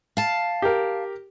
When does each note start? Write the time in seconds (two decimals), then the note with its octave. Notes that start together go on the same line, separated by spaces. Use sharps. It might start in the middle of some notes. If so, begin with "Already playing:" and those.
0.17 F5 A5
0.62 G4 A#4